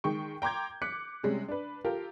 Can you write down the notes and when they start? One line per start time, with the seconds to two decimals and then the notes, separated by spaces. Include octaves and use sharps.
0.04 D#3 G#3 G5 C#6
0.42 G5 A#5 C6 D6 G6 G#6
0.82 D6 F#6 B6 C#7
1.24 C3 G3 G#3 C#4
1.49 D4 B4
1.85 F4 G4 A4 A#4